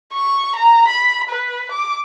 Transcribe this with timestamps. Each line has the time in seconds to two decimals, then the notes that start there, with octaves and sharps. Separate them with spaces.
0.13 C#6
0.56 A#5
0.88 B5
1.29 B4
1.71 D6